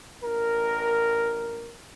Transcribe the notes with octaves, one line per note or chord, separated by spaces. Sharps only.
A1 A#4